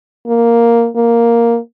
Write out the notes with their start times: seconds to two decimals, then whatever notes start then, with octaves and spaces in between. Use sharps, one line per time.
0.27 A#3
0.96 A#3